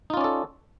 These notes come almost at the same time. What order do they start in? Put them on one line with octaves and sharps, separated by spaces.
D#4 F4 C#4 D5 A4